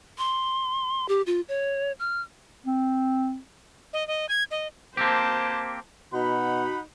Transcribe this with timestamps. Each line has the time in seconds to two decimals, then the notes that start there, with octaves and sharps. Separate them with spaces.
0.18 C6
1.09 G4
1.26 F4
1.49 C#5
1.99 F6
2.66 C4
3.93 D#5
4.08 D#5
4.29 G#6
4.51 D#5
4.97 A#3 C4 G4 C5 A5
6.13 B2 D#4 F#4 F#5 B5